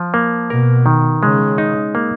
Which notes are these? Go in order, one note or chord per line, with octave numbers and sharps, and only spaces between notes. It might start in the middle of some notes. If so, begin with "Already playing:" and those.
Already playing: F3
A#3
B2 A#4
D#3
C#3 G#3
D#4
A#3